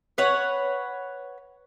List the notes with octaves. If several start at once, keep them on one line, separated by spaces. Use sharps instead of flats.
B4 C#5 F#5